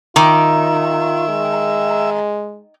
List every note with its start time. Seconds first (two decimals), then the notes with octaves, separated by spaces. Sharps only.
0.16 D#3 D#4 F4 E5 D6
1.29 G#3